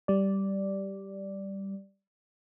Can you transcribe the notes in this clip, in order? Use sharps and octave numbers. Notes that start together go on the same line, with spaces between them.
G3 D5